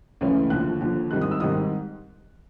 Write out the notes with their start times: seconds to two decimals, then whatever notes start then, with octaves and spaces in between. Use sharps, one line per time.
0.21 C#2 C#3 E3 A3 C#4
0.50 D#2 D3 F3 F#6
0.81 D#2 D3 F3
1.11 G#2 D#3 G3 C4 D#4 F#6
1.21 D#6
1.31 E6
1.40 G#2 D#3 G3 C4 D#4 D#6